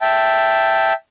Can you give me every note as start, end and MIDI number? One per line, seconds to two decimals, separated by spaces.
0.02 0.93 76
0.02 0.93 79
0.02 0.93 81